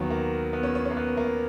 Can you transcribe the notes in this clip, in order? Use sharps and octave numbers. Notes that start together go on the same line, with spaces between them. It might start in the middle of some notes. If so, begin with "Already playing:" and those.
Already playing: D#2 D#3 F#3 B3
A#3
B3
C#4
C#4
C#4
A#3
B3
A#3